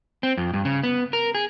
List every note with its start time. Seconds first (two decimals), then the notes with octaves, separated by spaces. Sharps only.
0.23 C4
0.37 F2
0.54 G2
0.65 C#3
0.83 B3
1.13 A#4
1.35 G#4